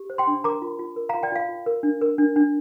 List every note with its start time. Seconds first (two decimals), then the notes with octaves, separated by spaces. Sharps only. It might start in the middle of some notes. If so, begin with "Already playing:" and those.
Already playing: G4
0.10 C5
0.18 G5 C6
0.27 D4
0.44 A#4 A#5 D6
0.62 F4
0.79 F4
0.96 A#4
1.09 F4 F5 A#5
1.23 D5 G5
1.32 F4 F5
1.49 F4
1.66 A#4
1.83 D4
2.02 A#4
2.18 D4
2.36 D4